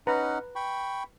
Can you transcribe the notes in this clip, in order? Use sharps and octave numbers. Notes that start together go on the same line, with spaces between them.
C#4 D#4 B4 F#5 A#5
G5 B5 C#6